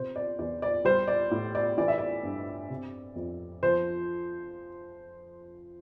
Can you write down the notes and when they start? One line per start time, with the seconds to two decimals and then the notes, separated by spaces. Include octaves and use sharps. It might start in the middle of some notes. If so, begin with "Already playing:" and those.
Already playing: C3 C5
0.16 D5
0.39 E2 D5
0.62 D5
0.85 G3 C5
1.08 D5
1.31 A2
1.55 D5
1.78 E3 D5
1.88 E5
1.98 D5
2.23 G2
2.70 C3
3.16 F2
3.63 F3 C5